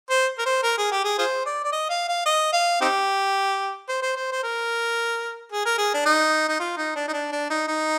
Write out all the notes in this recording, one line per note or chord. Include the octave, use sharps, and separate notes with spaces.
C5
A#4
C5
A#4
G#4
G4
G#4
F4 G#4 C5
D5
D5
D#5
F5
F5
D#5
F5
C4 D#4 G4
C5
C5
C5
C5
A#4
G#4
A#4
G#4
D4
D#4
D#4
F4
D#4
D4
D#4
D4
D4
D#4
D#4